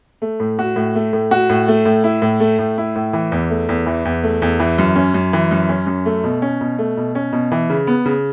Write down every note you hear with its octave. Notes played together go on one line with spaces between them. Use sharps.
A3
A2
F#4
A2
A3
A2
F#4
A2
A3
A2
E4
A2
A3
A2
E4
A2
E3
E2
A3
E2
E3
E2
A3
E2
E3
F#2
C#4
F#2
E3
F#2
C#4
F#2
A3
B2
C#4
B2
A3
B2
C#4
B2
E3
C#3
B3
C#3